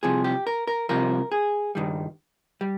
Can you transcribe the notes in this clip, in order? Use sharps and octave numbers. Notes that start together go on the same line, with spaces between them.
C2 C3 F3 G#4
G4
A#4
A#4
C2 C3 F3 A#4
G#4
G2 D#3 G3
G3